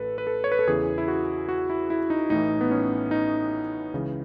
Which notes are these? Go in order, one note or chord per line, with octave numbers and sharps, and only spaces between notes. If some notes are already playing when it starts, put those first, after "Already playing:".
Already playing: A1 A4 B4
B4
A4
C#5
B4
A4
E2 C#3 E3 G#4
E4
F#4
F#4
E4
E4
D#4
A1 A2 E3 D#4
B3
C#4
D#4
C#2 C#3 E3